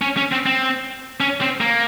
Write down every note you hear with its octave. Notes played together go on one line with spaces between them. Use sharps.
C#4
C#4
C4
C4
C#4
C4
A#3